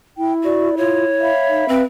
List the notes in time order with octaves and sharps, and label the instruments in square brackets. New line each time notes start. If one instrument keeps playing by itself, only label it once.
[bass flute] E4 [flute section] G5
[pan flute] F#4 [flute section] D5
[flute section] F4 [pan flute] C#5
[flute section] E5 F5 B5
[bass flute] D#4
[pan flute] C4 [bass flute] B4